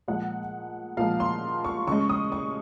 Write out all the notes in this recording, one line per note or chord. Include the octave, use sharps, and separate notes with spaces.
A#2 F3 G#3 F#5
A#2 F3 G#3 F5
C6
C#6
C#3 G#3 C#6
D#6
C#6